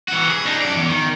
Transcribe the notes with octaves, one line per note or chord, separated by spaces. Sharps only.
E3 F#4
G#4
D4 D#4
F#2 D5
E2
D#3